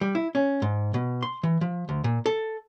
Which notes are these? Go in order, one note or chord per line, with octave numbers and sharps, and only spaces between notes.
G3
E4
C#4
G#2
B2
C6
E3
F3
D2
A#2
A4